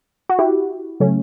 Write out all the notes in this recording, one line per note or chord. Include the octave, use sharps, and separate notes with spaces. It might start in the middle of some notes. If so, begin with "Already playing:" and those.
F#4
E4 G4
C#3 F#3 A3 C#4